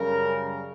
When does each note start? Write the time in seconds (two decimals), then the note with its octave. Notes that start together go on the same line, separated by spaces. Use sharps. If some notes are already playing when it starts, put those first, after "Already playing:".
Already playing: F#2 C#3 G3 A#4